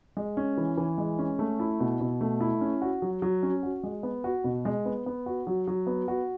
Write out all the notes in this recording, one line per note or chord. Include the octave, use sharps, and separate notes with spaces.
G#3
C#4
E3
E3
G#3
C#4
A3
E4
B2
B2
A3
E4
C#4
F#4
F#3
F#3
C#4
F#4
G#3
B3
F#4
B2
G#3
B3
B3
F#4
F#3
F#3
B3
F#4